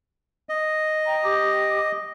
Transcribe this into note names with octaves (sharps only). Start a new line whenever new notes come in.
D#5
G5 A#5
G4 D6